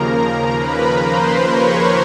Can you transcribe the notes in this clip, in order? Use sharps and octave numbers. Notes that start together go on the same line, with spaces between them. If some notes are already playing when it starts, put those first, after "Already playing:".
Already playing: D#2 C#3 F3 A#3 A#4 A#5
B4 B5
C5 C6
C#5 C#6